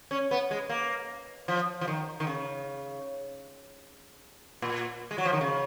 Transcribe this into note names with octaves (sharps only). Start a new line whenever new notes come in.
C#4
B3
G#3
A#3
F3
F3
D#3
D#3
C#3
A#2
G#3
F#3
F3
D#3
C#3